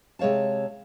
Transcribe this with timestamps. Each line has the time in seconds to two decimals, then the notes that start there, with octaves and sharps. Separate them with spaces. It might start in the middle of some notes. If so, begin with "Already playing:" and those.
0.19 C3 G#3 C#5 F5 A5